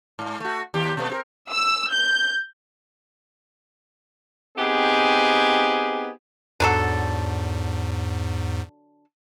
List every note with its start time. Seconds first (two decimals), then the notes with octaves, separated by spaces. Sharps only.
0.19 G#2
0.40 A3 F#4
0.74 D#2 G4
0.97 B2 A3 B3
1.09 C4 G4 A#4
1.52 E6
1.93 G6
4.57 B3 C4 D#4 G4 G#4
6.60 E2 G#2 D3 F#3 A4